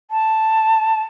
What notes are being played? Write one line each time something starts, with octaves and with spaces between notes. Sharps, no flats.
A5